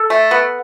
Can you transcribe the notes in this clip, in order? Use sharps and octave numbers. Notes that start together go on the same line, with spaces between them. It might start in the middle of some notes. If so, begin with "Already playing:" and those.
Already playing: A4
A3
B3